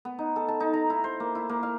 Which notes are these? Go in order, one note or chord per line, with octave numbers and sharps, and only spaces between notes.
B3
D#4
A4
A5
D#4
A#5
E4
C5
A#3
E4
A#3
F5